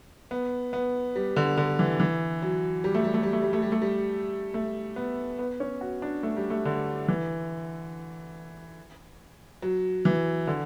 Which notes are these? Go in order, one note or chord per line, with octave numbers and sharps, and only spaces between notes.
B3
B3
G3
D3
D3
E3
E3
F#3
G3
A3
G3
A3
G3
A3
G3
A3
G3
A3
G3
A3
B3
B3
C#4
F#4
D4
A3
G3
A3
D3
E3
F#3
E3
D3